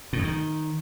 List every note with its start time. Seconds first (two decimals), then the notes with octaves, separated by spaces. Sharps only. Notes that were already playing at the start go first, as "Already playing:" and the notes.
0.13 A2
0.19 F2
0.25 D#3